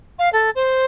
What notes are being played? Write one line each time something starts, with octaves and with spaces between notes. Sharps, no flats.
F5
A4
C5